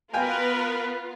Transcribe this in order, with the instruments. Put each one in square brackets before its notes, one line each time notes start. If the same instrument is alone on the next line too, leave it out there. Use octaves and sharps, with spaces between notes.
[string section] B3 F4 [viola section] A#4 B4 [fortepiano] F5 G5 G#5